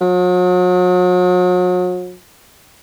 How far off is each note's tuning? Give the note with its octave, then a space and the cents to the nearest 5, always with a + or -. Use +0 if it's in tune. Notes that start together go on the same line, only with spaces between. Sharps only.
F#3 -40